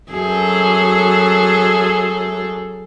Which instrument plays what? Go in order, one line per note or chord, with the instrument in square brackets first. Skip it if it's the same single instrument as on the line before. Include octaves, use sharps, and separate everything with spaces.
[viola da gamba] F#2 G#4 A4